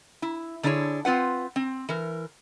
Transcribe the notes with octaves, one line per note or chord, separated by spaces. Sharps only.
E4
D3 D4 E4 G#4 C#5
C4 F4 B4 F#5
C4
E3 A#4